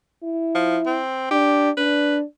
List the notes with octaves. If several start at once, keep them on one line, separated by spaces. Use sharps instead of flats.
E4
F3
C4
D4 G4
D4 B4